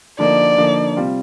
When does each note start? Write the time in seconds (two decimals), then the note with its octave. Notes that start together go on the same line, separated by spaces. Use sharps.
0.19 D3 F3 A#3 D#4 D5
0.58 D3 F3 A#3 D#4
0.97 C3 G3 C4 F4